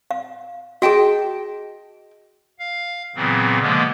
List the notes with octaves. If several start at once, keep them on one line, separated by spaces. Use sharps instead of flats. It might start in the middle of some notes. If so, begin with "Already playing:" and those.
F5
F#4 G#4 D#5 G5 A5
F5
A#2 C#3 E3 F#3 B3 C4
B2 D3 F3 G#3 A#3 B3